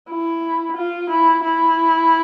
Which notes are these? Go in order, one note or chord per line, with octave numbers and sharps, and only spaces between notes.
E4
F4
E4
E4